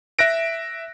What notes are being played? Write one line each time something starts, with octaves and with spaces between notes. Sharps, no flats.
E5 F#6 A#6 D7